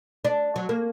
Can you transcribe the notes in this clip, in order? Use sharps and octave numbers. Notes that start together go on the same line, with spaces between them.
D4
F#3
A#3